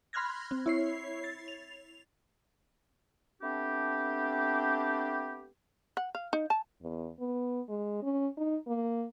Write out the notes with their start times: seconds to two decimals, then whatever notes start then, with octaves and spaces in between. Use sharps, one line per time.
0.13 B5 C6 F6 F#6 G#6 A#6
0.51 C4
0.66 E4 C#5 C7
1.24 A6
1.48 F7
3.42 A3 B3 C4 D4 G4
5.97 F#5
6.15 F5
6.33 D#4
6.50 A5
6.82 E2
7.20 B3
7.69 G#3
8.03 C#4
8.37 D#4
8.68 A#3